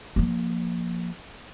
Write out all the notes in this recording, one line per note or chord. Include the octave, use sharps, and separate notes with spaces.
F3 A#3